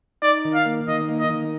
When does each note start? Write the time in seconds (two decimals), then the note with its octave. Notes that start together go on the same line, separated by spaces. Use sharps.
0.22 D#4 D5
0.45 D#3
0.54 F5
0.66 A#3
0.88 D#3 D#5
1.09 A#3
1.20 D#5
1.30 D#3